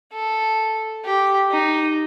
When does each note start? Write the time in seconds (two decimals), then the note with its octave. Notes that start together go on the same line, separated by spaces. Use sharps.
0.13 A4
1.04 G4
1.52 D#4